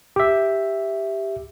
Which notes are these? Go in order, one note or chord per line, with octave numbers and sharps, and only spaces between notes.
G4 E5